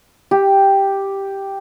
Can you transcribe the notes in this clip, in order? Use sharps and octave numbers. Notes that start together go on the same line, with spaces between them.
G4